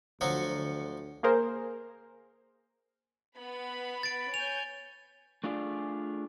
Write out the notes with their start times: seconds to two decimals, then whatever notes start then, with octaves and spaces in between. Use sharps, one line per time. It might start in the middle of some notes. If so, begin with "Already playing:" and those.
0.21 D2 D3 F3 F#3 C#7
1.23 A#3 G#4 A#4 C5
3.37 B3 B5
4.03 A6 D7
4.34 C#5 G#5 G6 F7
5.44 A3 D4 F4 G#4 D5